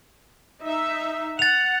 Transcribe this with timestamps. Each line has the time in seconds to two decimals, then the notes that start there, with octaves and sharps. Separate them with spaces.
0.63 D#4 E5
1.39 F#5 A6 F7